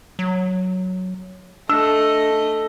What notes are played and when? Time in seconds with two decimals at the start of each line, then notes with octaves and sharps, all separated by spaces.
0.19 F#3
1.69 A3 D4 D#5 E6